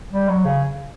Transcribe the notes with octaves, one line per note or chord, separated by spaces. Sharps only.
G3
F#3
C#3